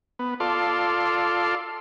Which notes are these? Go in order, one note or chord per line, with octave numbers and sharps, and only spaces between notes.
B3
F4 A4 D5 C6